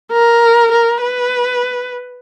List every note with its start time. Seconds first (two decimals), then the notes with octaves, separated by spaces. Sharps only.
0.12 A#4
0.72 A#4
1.02 B4